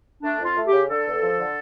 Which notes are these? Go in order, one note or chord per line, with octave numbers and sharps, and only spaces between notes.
A3 D4
F2
F4
A3
G4
C#3
D3 A4
E2
F3
D3